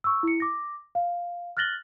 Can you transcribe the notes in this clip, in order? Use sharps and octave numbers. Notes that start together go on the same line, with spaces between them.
C#6 E6
E4 C#7
D6 A#6
F5
F6 F#6 A6 A#6 F#7 G7